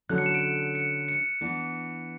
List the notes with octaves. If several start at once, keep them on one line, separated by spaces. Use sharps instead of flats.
D3 F#3 C#4 E4 A4 F#6
C#7
E7
D7
C#7
C#7
E3 B3 D4